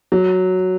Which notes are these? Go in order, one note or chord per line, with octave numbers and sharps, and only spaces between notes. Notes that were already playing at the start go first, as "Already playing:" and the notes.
F#3